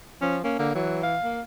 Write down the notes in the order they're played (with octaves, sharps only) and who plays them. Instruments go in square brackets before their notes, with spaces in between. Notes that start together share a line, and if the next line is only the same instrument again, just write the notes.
[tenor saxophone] F3 [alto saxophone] C#4
[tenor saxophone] A#3 [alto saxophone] C#4
[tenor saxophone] D3 [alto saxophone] A#3
[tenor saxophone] E3 [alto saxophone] F#3
[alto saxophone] F5
[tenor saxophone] A#3